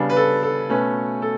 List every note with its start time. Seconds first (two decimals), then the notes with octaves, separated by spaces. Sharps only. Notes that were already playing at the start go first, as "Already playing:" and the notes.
Already playing: C#3 G3 B3 D4
0.09 B4
0.16 A4
0.43 A4
0.69 B2 A3 C#4 B4
1.22 A4